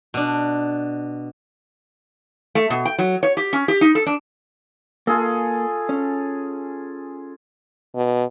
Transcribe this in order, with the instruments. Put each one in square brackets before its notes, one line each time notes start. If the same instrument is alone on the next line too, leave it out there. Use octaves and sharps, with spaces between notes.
[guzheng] B2 D4
[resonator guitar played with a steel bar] A3
B2
G5
F#3
C#5
G4
C#4
G4
D#4
A4
D4
[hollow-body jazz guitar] A#3 [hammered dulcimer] F4 G#4 A4
[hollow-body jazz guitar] C#4
[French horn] B2